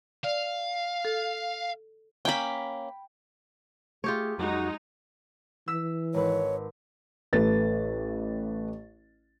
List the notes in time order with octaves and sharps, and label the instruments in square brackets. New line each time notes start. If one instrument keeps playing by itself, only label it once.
[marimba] D5 [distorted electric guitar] F5
[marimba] A4
[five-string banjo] A#3 C#4 [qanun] G5 B5
[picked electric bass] A3 [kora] F4 G4 C#5 [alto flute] G#4
[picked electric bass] F2 F#3 [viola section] G#3 D#4 [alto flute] F#4
[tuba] E3 [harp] E6 B6 E7
[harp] G#1 B4 [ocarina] C#5
[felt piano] A1 A3 B4 A6